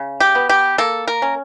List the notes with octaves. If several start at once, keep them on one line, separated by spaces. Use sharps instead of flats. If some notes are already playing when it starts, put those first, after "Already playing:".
Already playing: C#3
G4
B3
G4
A#3 A4
A#4
C#4